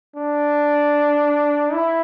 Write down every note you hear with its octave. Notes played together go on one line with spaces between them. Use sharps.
D4
E4